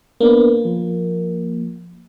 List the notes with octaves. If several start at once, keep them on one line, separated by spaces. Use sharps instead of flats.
A#3 B3 D4 B4
F3